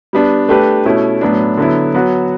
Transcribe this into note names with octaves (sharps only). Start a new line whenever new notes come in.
G3 B3 D4
A3 D4 G4 B4
B2 A3 C#4 E4
A2 F#3 B3 D4
D3 F#3 B3 E4
F#3 B3 F#4